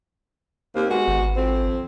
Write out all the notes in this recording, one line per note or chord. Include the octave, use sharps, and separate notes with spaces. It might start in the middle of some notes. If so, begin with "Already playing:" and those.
D#2 A#3 C4
G#3 B3 F#4
G#1
F2 C4